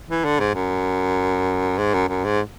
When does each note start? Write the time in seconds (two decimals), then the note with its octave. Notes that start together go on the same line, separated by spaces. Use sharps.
0.09 E3
0.24 D3
0.39 G#2
0.55 F#2
1.78 G#2
1.94 F#2
2.09 F#2
2.24 G#2